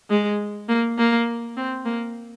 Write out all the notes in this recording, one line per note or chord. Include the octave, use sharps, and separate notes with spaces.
G#3
A#3
A#3
C4
A#3